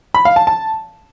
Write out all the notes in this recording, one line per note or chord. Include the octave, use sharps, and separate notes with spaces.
B5
F5
A5
A5